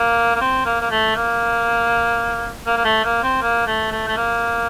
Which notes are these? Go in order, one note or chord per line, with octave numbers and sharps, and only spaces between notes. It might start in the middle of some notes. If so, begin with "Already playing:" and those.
Already playing: A#3
A#3
C4
A#3
A#3
A3
A#3
A#3
A#3
A3
A#3
C4
A#3
A3
A3
A3
A#3